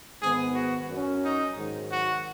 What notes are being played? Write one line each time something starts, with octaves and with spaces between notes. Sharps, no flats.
G#2 D#3 B3 G#4
F#4
F#2 F#3 C#4
D#4
G#2 D#3 F#3
F#4